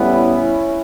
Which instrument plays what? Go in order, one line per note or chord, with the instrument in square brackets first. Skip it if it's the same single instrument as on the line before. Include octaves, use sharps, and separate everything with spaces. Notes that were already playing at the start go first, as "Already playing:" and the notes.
Already playing: [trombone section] A2 G3 B3 C#4 E4